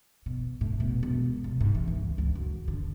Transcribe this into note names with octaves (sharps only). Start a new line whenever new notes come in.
B2
A2
B2
E1
C2
G#2
E3
C#2
C#2
F#2
D3